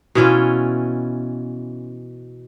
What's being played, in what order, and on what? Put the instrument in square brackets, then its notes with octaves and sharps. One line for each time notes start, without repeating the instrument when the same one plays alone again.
[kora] B2 E3 C#4 F4